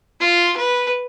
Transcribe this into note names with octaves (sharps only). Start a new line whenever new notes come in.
F4
B4